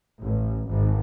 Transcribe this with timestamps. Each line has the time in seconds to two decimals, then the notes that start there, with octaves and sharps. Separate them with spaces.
0.22 A1
0.68 G#1